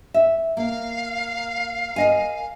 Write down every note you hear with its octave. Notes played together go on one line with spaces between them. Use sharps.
E5
A#3 F5
A#4 D#5 G#5